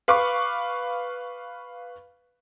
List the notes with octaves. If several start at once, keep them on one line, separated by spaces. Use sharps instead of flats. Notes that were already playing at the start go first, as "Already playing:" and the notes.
B4 F5 B5 C#6 D6